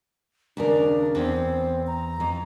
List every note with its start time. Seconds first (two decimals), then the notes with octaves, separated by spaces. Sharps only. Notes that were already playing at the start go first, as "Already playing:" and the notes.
0.57 D#2 C#3 D4 A#4
1.15 E2 C4
1.87 A#5
2.20 F2